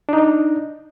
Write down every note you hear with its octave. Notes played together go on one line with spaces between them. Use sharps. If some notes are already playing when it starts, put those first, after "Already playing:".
D4 D#4 D#5